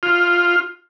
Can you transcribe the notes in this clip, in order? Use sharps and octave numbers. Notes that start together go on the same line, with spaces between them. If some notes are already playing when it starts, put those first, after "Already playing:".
F4